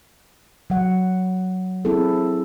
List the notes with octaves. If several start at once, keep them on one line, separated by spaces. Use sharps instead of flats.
F#3 F#5
C4 E4 G#4 A4